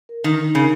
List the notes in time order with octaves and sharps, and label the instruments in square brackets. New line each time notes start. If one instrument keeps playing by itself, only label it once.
[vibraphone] A#4
[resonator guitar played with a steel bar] D#3 [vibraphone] D#4
[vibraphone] D#4
[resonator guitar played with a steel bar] C#3 [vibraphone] A#4